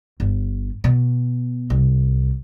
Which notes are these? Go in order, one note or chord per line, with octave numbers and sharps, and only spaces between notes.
G1
B2
C2